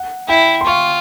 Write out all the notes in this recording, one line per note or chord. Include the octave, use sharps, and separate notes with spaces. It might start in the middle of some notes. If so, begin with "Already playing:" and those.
Already playing: F#5
E4 G5
C6
F4 C#6